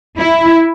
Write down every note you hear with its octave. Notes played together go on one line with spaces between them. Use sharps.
E4